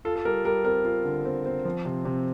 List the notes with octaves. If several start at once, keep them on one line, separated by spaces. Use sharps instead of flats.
F4 A4
A4
G3 A#4
G3 A#4
C4 A#4
F4
D3
C4
C4
F3
C3
C3